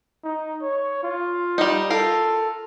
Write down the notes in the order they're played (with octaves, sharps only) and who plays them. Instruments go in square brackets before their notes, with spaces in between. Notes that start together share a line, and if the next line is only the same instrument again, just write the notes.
[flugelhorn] D#4
C#5
F4
[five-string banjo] G3 D#4
[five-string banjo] F4 A#4 [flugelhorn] A4